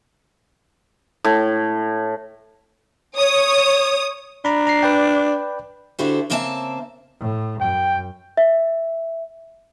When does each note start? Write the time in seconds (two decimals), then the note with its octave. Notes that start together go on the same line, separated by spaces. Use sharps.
1.24 A2
3.16 C#5 D#6
4.45 D4 A#5 B5
4.67 A#5 C7
4.83 B4 D5 G5
5.99 D3 E4 F#4 G4 A4 C5
6.30 C#3 A#3 C4 E5 F5 A5
7.19 A2
7.61 F#2 G5
8.37 E5